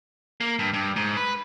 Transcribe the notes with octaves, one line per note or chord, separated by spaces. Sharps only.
A#3
G2
G2
G#2
B4